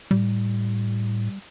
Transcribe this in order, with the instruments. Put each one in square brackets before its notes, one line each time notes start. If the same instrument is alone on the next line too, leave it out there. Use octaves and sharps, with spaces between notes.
[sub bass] A2 [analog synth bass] G3